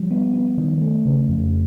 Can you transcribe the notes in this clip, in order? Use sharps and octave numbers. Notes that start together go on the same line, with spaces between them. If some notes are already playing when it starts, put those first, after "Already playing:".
Already playing: F3 G3
B3
B3
D#3
A3
C#3
F2